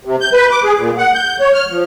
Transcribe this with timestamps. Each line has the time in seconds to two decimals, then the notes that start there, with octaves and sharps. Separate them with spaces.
0.05 C3
0.21 G6
0.33 B4
0.51 D6
0.64 G#4
0.78 A#2
0.98 F#5
1.14 G6
1.40 C#5
1.54 F6
1.69 F3